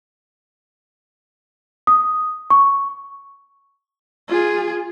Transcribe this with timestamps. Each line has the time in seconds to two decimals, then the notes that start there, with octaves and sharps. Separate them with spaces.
1.87 D#6
2.50 C#6
4.28 F4 G#4